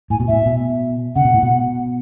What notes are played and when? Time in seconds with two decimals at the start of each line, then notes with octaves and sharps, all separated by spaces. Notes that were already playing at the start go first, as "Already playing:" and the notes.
0.10 A2 G#5
0.20 B2
0.28 A2 E5
0.46 B2
1.16 C#3 F#5
1.25 B2
1.34 A2
1.43 B2